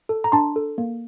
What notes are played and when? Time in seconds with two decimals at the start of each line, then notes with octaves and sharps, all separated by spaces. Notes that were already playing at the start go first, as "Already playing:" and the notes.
0.09 A4
0.24 A#5
0.32 D4 A5 C6
0.56 A4
0.78 A#3